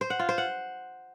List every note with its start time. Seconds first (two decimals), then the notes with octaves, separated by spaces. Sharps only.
0.01 C5
0.10 F#5
0.19 F4
0.29 C5
0.38 F#5